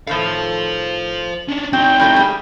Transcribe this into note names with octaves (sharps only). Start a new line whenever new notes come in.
A2 D#3 A4 C5 F5
C#4 D4
F#3 C4 D#4 G5
A2 F#3 A3
G3 G#4